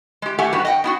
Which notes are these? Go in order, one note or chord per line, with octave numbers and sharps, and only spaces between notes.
G#3 G4
A3 G4 A4 F#5 G#5
G2 B3 F#4 G4
D#5 F#5 G5
B3 E4 F#4